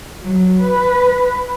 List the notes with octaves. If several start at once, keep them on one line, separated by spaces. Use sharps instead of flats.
F#3
B4